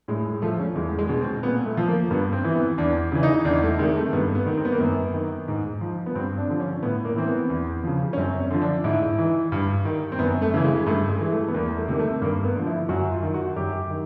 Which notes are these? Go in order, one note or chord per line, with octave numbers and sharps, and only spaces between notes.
A2 G#3
G#3
F3 A3
C#4
E2 G#3
G#3
B2
C4
A#2 B3
A3
F3
A#3
G2 B3
C4
E3
B3
E2 D4
C#3 E3
D#4
E2 D4
A3
C3 D#3 G#3
A3
G2 B3
B3
D#3
C4
B3
A#3
F#2 B3
D#3
G#2
F3
B3
G2 C4
D4
D3 F3
C#4
A2 B3
A#3
E3 C4
B3
E2
C#3 F3
C#4
F#2 C4
C#4
D3 F3
D4
G#2 E4
E3
G2
D#3
C4
F#2 B3
A3
C#3 E3
G#3
G2 A3
G#3
E3
A3
B3
E2 A#3
A3
C3 D#3 A#3
A3
G2 A#3
B3
D3 F3
E4
F#2 F#4
F4
D#3
F#4
F#2 G4
D#3